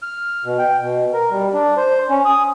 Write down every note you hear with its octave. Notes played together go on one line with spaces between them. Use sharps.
F6
B2
G5
B2
A#4
G3
D4
C5
C#4
D#6